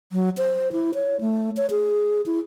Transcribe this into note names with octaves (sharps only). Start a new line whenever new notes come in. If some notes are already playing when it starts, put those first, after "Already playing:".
F#3
C5
E4
C#5
A3
C#5
G#4
E4